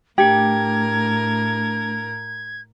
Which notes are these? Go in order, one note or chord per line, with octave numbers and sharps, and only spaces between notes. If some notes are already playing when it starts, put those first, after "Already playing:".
A2 A3 D4 G4 A#4 G#6